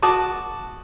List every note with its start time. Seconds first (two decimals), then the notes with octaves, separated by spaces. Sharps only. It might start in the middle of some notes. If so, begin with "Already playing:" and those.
0.02 F#4 A5 D6 D#6